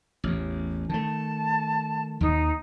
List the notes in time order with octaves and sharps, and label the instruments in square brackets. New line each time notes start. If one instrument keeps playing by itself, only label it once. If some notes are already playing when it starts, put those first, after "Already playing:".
[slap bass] A1 E2
[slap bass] D#3 A3 [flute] A5
[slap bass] D#2 D#3 [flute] D#4